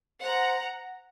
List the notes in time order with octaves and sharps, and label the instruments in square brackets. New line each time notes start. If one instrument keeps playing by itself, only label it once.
[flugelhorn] C5 [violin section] F#5 A#5